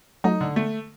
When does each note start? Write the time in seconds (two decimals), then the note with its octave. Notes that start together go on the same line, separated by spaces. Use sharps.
0.24 F#3 A3 D#4
0.41 D3
0.56 A3